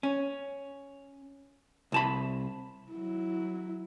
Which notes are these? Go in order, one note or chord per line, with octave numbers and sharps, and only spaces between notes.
C#4
C2 A5 B5
F#3 E4